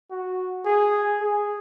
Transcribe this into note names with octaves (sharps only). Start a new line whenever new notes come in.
F#4
G#4
G#4